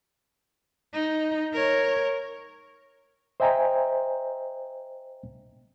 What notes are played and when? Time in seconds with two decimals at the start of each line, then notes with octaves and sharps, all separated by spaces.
0.93 D#4
1.53 A#4 C#5
3.40 C5 D#5 E5 G5 G#5 A#5